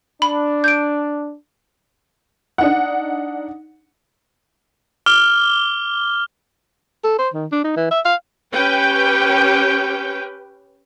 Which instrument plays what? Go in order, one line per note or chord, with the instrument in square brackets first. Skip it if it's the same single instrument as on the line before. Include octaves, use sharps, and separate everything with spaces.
[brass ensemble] D4 [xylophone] B5
[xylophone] G6 D7
[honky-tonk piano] D4 D#4 F#5
[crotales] D6 F6 G7
[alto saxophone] A4
C5
D#3
D4
D#4
E3
E5
F5
[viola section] C#4 G4 B4 G5